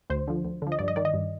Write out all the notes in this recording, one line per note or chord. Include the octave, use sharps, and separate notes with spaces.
D2 C5
D3 F3
D2
D3 F3
D#5
G2 D5
D#5
D#3 D5
D#5
G2